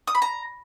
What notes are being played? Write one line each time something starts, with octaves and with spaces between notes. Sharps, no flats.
D#6
B5
A#5